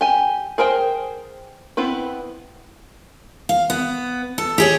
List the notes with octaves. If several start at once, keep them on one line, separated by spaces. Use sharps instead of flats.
G4 G#5
G#4 A#4 C5 G5
B3 C4 E4 B4
F5
B3
A4
G4 G#4 C#5